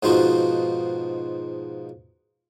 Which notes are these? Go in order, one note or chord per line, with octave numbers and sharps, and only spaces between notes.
G#2 B2 F3 D#4 F4 F#4